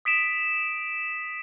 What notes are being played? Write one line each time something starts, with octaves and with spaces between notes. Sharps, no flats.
D#6 B6 D7 E7